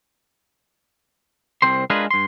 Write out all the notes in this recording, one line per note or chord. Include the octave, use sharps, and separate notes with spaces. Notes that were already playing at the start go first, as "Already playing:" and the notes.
C2 C4 C5 C6
G#3 D4 F4 G#4 A#4 B4
G2 C6